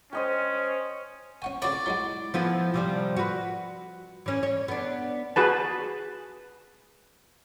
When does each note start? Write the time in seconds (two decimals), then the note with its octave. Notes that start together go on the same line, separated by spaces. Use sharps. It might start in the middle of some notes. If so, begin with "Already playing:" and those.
0.13 C#4 C5 D#5 G5
1.42 C#4 F#5 G#5 C#6
1.62 C#3 F#4 C#5 D5
1.86 F#3 G#3 E4 F#4
2.34 F3 B3 E4
2.74 C3 F3 G3
3.16 F#4 B4
4.26 E3 C#4
4.43 C#5
4.68 B3 D4
5.36 F#4 G#4 B4 A5